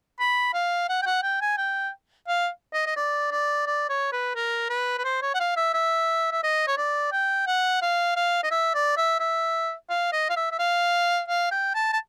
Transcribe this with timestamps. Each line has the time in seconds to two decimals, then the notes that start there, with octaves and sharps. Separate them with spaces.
0.19 B5
0.54 F5
0.89 F#5
1.02 G5
1.06 F#5
1.23 G5
1.41 G#5
1.58 G5
2.28 F5
2.73 D#5
2.86 D#5
2.96 D5
3.31 D5
3.66 D5
3.89 C#5
4.12 B4
4.36 A#4
4.70 B4
4.98 B4
5.04 C5
5.22 C#5
5.34 F#5
5.40 F5
5.56 E5
5.74 E5
6.32 E5
6.43 D#5
6.67 C#5
6.77 D5
7.12 G5
7.47 F#5
7.82 F5
8.16 F5
8.43 D#5
8.51 E5
8.74 D5
8.97 E5
9.20 E5
9.89 F5
10.12 D#5
10.29 F5
10.36 E5
10.52 E5
10.59 F5
11.28 F5
11.51 G5
11.75 A5
11.93 A5